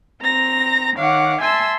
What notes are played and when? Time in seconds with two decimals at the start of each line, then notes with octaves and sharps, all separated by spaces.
0.22 C4 A#5 A#6
0.96 D#3 C#5 F5 F#5 D6
1.40 E5 G#5 A5 C6 E6